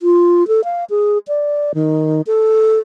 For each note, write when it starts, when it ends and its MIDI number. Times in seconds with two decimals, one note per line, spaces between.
0.01 0.47 65
0.48 0.64 69
0.64 0.84 77
0.90 1.18 68
1.28 1.72 74
1.75 2.22 51
2.27 2.79 69